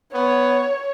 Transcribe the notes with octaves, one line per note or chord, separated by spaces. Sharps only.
B3 C#5